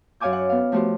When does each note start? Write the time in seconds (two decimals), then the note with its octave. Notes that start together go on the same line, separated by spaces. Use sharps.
0.20 F#2 C#5 F5 G#5 D6 G6
0.33 F#5
0.50 B3 F5
0.72 F3 A3 F#4 G4 C5